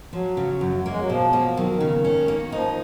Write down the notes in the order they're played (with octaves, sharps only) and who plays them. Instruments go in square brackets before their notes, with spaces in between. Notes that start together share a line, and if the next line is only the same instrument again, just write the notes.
[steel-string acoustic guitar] F3 [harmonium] F#3
[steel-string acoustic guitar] C#3
F#2
[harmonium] G#3 [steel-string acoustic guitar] A#3
[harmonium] F#3
[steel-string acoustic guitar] B2 [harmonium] F3
[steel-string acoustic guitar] A#3
[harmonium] D#3 [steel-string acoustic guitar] F#3
[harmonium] D#3
[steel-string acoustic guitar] C#3
C#4
A#3
[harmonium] F3 [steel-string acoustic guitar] D#4